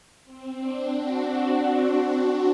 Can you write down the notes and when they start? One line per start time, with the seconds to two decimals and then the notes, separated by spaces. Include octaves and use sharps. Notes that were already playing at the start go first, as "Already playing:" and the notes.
0.23 C4
0.57 D4
0.91 D4 F#4